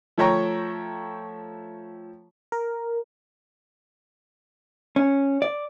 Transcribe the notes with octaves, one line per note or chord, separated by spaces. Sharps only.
F3 A3 C#5 G5 A#5 C#6
A#4
C#4
D5